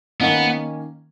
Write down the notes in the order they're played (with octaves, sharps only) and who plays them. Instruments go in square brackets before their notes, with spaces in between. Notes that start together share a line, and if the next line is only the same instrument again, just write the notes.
[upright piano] D#3 A#3 C#4 [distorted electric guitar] B3